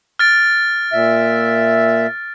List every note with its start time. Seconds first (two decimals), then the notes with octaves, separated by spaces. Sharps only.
0.19 F6 A6 D7
0.92 A#2 E5